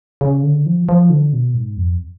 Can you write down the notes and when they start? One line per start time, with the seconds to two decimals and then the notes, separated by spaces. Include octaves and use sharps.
0.21 C#3
0.43 D3
0.66 F3
0.89 F3
1.10 D3
1.33 B2
1.55 G#2
1.77 F2